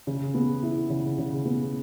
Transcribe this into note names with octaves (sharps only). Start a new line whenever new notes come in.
C#3
B3
E4
C#3
C#3
B3